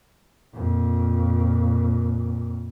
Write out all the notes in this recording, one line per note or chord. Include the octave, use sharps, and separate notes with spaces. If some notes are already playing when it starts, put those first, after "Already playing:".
F2 A#2